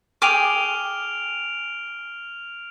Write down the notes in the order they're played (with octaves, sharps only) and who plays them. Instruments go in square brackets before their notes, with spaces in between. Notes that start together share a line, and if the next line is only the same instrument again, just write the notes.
[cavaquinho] G#4 G5 D6 [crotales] F6 D7 F7